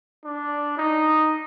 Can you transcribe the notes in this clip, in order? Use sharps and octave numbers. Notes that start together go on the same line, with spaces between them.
D4
D#4